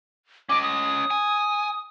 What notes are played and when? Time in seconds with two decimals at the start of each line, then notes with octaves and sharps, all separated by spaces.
0.49 C#4 D#5 D6
0.63 D#6
1.11 G#5